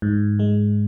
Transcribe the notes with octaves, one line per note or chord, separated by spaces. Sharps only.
G#2
G#3